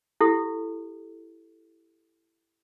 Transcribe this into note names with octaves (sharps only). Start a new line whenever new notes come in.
E4 G4 A4